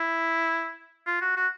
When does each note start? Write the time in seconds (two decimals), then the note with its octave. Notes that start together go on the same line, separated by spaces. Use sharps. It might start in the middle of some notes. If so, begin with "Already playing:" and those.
Already playing: E4
1.06 F4
1.21 F#4
1.37 F#4